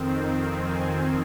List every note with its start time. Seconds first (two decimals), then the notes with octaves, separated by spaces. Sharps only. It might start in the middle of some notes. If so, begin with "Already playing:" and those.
Already playing: F2 D#3 C4
0.54 G#5